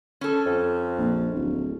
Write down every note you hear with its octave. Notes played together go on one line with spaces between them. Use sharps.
C#4 A4
F2
A#1
D1